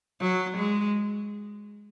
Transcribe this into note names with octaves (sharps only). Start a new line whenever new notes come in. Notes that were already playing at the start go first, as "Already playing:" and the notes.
F#3
G#3